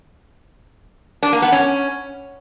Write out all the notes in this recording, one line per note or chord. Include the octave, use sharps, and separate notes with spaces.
D4
A#3
B3
C#4